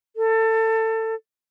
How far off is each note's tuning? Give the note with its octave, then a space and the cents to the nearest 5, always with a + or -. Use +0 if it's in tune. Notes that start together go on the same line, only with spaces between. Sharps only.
A4 +25